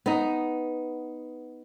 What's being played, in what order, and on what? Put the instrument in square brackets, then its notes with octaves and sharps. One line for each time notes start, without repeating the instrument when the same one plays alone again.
[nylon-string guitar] B3 D#4